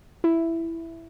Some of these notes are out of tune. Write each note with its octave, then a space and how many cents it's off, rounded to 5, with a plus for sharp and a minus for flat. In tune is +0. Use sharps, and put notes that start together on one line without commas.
E4 +5